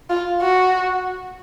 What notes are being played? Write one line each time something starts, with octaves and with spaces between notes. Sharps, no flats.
F4
F#4